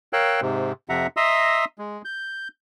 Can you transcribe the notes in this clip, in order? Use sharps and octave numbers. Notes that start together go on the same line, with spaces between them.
A#4 C#5 F5 G5 E6 F#6
G#2 C3
F2 C3 F3 E5 F#5 A#5
D#5 E5 A#5 C6 D#6 E6
G#3
G6